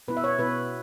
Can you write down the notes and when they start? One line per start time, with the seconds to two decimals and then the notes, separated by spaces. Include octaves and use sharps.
0.08 B2 B3 E4 B4
0.17 E5
0.24 C#5
0.39 B2 B3 E4 B4